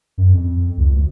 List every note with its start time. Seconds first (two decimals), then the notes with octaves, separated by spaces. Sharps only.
0.18 F#2
0.34 F2
0.78 C#2
0.94 D2